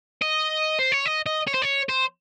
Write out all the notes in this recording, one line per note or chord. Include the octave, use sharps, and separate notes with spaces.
D#5
C5
C#5
D#5
D#5
C#5
C5
C#5
C5